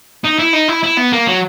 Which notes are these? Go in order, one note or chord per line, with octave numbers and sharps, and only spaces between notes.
D#4
E4
D#4
E4
E4
B3
A#3
F#3